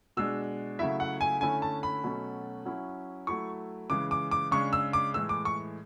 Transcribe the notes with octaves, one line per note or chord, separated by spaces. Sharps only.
B2 G#3 D4 E6
C#3 F#3 A3 E4 E5
F#5
G#5
D3 A3 C#4 E4 G#5
A5
B5
B2 F#3 A3 C#4
F#3 C#4 E4
F#3 A3 E4 C#6
C#3 E3 G#3 D6
D6
D6
C#3 G#3 D4 C#6
E6
D6
A2 E3 G#3 E6
D6
C#6